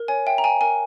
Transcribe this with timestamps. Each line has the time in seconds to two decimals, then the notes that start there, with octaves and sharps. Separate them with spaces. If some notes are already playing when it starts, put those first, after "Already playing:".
Already playing: A#4
0.08 C#5 G#5
0.26 E5 G5
0.38 A#5
0.44 G5 G#5
0.61 A#4 G#5